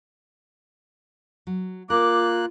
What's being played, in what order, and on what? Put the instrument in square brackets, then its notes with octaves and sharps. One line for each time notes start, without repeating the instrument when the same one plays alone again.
[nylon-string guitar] F#3
[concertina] A#3 F#6 [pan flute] F4 [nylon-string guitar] A#4 [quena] D6